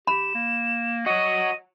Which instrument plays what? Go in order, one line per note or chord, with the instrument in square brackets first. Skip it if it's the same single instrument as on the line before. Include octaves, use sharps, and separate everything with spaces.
[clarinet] G4 [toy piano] B5 [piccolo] E7
[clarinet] A#3
[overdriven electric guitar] F#4 C#5 [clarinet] D#5 [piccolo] D#7